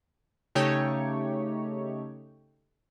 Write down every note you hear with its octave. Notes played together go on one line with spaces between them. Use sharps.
C#3 A3 D#4 G4 C#5